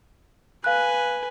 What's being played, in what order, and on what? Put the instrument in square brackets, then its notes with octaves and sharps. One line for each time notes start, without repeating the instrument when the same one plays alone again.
[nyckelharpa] B4 G#5 [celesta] F5 F#6